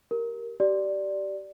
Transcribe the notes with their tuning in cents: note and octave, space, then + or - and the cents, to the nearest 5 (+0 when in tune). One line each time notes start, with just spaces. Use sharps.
G4 -10 A#4 +0
G4 -25 D5 +0